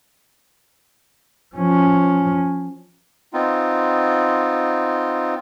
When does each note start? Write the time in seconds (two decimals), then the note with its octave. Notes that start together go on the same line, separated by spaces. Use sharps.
1.55 F3 C#4
3.33 B3 C4 D#4 F4